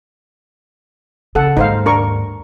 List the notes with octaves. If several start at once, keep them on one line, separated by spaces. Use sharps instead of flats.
C#3 A4 F#5
D#2 G#2 D#4 C5 F5
D4 A#4 C#6